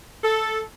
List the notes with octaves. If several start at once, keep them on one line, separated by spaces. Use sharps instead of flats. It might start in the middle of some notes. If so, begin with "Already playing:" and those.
A4